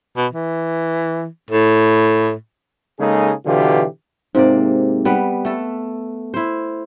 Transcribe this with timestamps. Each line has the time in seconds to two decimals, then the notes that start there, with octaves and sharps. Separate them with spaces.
0.17 B2
0.33 E3
1.51 A2
2.99 C#3 G#3 A#3 D#4 G#4 A4
3.45 B2 D3 E3 F#3 F4 G4
4.35 G#2 C3 A#3 D5
5.05 G3 B3
5.45 A3 A4
6.34 E4 C5